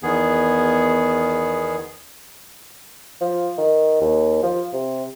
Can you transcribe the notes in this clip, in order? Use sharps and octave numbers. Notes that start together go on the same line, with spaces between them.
E2 D#3 B3 G#4
F3
D#3
D#2
F3
C3